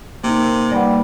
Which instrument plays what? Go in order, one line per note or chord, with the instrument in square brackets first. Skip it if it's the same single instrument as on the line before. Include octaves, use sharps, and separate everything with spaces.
[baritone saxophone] C3 [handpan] A#3 D#4
[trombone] G3 [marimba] A#3 F#5 [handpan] B4 D5